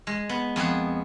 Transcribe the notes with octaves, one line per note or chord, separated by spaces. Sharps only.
G#3
B3
F2 B3 G#4 B4